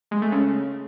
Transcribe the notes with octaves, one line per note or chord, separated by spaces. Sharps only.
G#3
A3
C#3